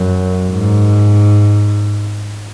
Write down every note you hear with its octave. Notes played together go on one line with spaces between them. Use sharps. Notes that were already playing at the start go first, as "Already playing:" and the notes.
Already playing: F#2
G#2